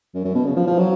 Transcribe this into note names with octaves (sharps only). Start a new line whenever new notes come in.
F#2
F#2
B2
C#3
F3
F3
F#3